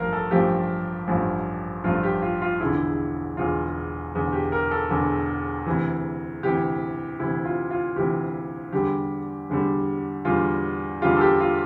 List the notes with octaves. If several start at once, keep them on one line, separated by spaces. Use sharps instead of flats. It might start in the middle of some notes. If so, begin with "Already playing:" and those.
Already playing: A1 G2 F3 A3 A#4 F5
A4
A1 G2 F3 A3 G4
A1 G2 F3 A3
A1 G2 F3 A3 F4
G4
F4
F4
E1 E2 D3 E4
E1 E2 D3 F4
E1 E2 D3
G4
A#4
A4
E1 E2 D3
D2 C3 E3
D2 C3 E3 G4
D2 C3 E3 E4
F4
F4
D2 C3 E3 G4
E2 D3 G3 G4
E2 D3 G3
E2 D3 G3 F4
E2 D3 G3 F4
A4
G4
F4